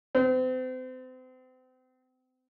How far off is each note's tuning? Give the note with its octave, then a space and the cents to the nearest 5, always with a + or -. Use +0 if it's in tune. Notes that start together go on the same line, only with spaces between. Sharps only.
C4 -35